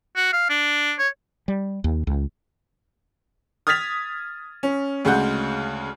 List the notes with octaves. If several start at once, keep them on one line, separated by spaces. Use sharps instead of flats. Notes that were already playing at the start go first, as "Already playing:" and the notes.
F#4
F5
D4
C#5
G3
D#2
C#2
D#6 F6 G#6 A6 B6 F7
C#4
D2 C#3 G#3 F#5 G6